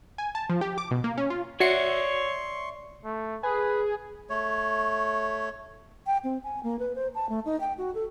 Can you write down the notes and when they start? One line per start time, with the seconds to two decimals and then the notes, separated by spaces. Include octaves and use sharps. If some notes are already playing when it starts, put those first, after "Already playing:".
0.18 G#5
0.35 A5
0.50 F3
0.61 G4
0.78 D6
0.91 B2
1.04 A#3
1.18 C#4
1.30 F4
1.60 F#4 C#5 D5 E5 C6 C#6 C7 C#7
3.04 A3
3.43 G#4 B4
4.30 A3 C#5
6.07 G5
6.24 C4
6.44 G#5
6.63 A#3
6.79 B4
6.95 C5
7.15 A5
7.29 A3
7.46 D#4
7.61 G5
7.78 F#4
7.95 A4